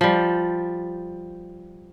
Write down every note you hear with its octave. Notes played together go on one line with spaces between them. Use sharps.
F3 G3